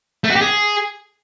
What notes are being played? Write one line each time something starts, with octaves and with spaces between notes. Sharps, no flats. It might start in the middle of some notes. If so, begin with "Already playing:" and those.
A3
F#4
G4
G#4